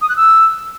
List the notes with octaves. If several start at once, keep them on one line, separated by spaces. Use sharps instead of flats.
D#6
F#6
E6